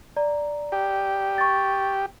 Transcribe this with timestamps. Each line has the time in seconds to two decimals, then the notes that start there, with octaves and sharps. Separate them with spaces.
0.17 D5 A#5
0.72 G4
1.38 C#6 A6